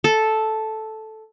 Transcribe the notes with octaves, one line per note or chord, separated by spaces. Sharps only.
A4